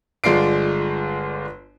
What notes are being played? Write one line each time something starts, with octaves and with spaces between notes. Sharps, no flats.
G1 G#3 F4 D5 C7 D7